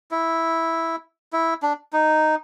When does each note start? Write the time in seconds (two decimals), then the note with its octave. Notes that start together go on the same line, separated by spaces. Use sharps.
0.11 E4
1.33 E4
1.62 D4
1.93 D#4